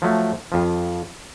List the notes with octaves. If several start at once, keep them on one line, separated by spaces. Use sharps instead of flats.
F3 F#3 A3
F2 F3